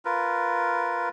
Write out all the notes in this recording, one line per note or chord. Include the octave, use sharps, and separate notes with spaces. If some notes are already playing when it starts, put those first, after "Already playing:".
F4 A#4 B4